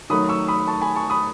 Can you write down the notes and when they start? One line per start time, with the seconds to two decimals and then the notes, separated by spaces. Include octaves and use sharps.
0.10 D#3 F#3 A3 B5 D#6
0.29 C#6 E6
0.48 B5 D#6
0.60 B5
0.67 A5 C#6
0.81 G#5 B5
0.95 A5 C#6
1.10 B5 D#6